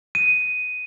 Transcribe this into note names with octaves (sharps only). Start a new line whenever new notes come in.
D#7